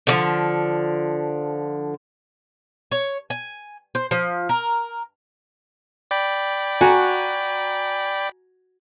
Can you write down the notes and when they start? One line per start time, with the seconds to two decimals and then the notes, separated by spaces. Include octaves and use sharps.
0.07 D3 E3 F3
2.91 C#5
3.30 G#5
3.95 C5
4.11 F3
4.49 A#4
6.11 D5 G5 B5
6.81 F#4 G#5 A#5